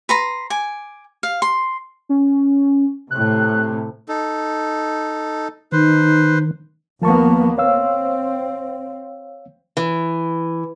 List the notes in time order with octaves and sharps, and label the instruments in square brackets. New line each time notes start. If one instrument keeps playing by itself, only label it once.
[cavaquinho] B4 A#5 C6
G#5 D6
F5
C6
[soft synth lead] C#4
[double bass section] A2 C3 [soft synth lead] F#6
[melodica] D#4 A4
[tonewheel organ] D#3 [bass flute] D#4 [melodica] B4 C5
[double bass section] D#2 A#3 B3 [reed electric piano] F3 A5 C#6
[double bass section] C4 [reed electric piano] C#5 F5 E6
[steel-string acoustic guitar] E3